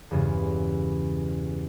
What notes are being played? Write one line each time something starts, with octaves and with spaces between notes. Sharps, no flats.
E2 G2 C#3 G#3 B3